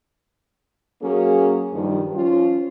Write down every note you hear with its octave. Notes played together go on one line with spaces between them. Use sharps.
F#3 A#3 C#4 G#4
G2 D#3 F3 G3
F3 C#4 F4